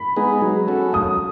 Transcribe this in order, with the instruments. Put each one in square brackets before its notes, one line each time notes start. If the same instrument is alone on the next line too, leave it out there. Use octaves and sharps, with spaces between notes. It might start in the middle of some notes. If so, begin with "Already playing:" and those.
Already playing: [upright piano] B5
[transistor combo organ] G#3 B3 D#4 G#4
F#3
C#4 F#4 A4
[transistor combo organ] F#3 [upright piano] D#6